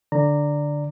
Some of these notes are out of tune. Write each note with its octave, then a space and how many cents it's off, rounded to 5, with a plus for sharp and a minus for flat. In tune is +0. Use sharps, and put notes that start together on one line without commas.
D3 +0 D5 +0 A#5 -15